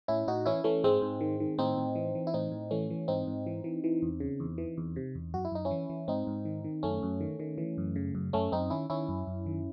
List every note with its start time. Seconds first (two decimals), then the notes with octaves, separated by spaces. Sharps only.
0.08 A2 C#4 E4
0.28 A2 D#4 F#4
0.46 E3 C#4 E4
0.64 E3 A3 C#4
0.84 G#2 G#3 C4
1.02 G#2
1.21 D#3
1.40 D#3
1.58 A2 C4 D#4
1.78 A2
1.95 E3
2.15 E3
2.27 E4
2.34 A2 C4 D#4
2.52 A2
2.71 E3 A3 C#4
2.90 E3
3.08 G#2 C4 D#4
3.27 G#2
3.46 E3
3.64 E3
3.84 E3
4.02 E2
4.20 C#3
4.40 E2
4.58 E3
4.78 E2
4.96 C3
5.15 E2
5.34 F#2 F#4
5.45 E4
5.52 F#2 D#4
5.65 C#4 E4
5.71 E3
5.90 E3
6.08 G#2 C4 D#4
6.27 G#2
6.45 D#3
6.64 D#3
6.83 F#2 A3 C#4
7.03 F#2
7.21 D#3
7.40 D#3
7.58 E3
7.78 F#2
7.96 C#3
8.15 F#2
8.33 F#2 A3 C#4
8.52 F#2 C4 D#4
8.70 D#3 C#4 E4
8.90 D#3 C#4 E4
9.08 F#2
9.27 F#2
9.46 D#3